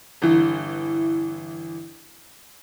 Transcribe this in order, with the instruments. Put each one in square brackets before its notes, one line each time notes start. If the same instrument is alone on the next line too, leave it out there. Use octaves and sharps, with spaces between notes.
[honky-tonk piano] G1 E3